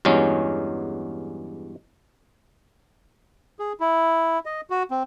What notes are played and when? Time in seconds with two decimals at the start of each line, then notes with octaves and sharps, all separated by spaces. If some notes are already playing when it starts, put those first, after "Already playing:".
0.05 E2 G2 F#3 G#3 C#4
3.59 G#4
3.80 E4
4.45 D#5
4.70 F#4
4.91 C4